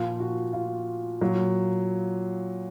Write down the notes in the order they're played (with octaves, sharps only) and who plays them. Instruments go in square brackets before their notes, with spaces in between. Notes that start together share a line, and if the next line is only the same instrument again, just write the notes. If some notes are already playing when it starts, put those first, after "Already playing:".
Already playing: [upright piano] A#2 F3 F4
F#4
F4
A#2 F#3